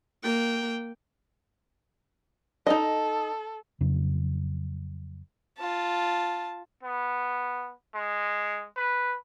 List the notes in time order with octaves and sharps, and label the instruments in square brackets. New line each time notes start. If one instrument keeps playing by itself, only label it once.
[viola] A#3 G5
[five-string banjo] D#4 D#5 [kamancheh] A4
[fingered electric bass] F2 C#3 F#3
[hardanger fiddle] F4 A5
[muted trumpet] B3
G#3
B4